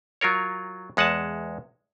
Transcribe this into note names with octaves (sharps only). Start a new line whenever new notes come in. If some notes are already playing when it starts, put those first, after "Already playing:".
F#3 F4 A#4 C#5
E2 G#3 F#5 G#5 A5